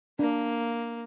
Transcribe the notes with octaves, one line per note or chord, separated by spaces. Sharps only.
A#3 D4